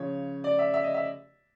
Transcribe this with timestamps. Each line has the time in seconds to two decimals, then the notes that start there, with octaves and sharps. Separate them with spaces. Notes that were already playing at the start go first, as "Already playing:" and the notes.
Already playing: C#3 F3 C#5
0.44 D5
0.59 E5
0.74 E5
0.84 D#5
0.94 E5